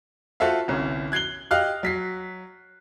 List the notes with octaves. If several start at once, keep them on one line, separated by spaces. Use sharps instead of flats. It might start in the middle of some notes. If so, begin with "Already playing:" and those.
F4 F#4 A4 C5 E5 F5
G1 C2 C#4
F#6 G#6 C7 F#7 G7
G4 D#5 F5 F6 F#6
F#3 B6 C7